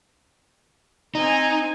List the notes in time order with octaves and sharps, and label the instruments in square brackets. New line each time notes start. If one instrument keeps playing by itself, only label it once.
[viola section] C4 G#5 [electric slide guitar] D#4